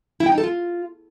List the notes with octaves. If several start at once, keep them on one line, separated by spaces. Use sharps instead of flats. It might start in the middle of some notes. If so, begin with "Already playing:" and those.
E4
G5
D#4
A4
F4